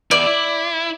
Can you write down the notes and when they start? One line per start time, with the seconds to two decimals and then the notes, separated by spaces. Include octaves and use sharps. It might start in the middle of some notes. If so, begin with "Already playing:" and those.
0.11 E2 E4 D5
0.27 E4